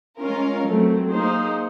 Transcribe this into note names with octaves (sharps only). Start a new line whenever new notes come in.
G#3 C#4 F4 A#4
F#3 A3 C4
A#3 D#4 G#4 C5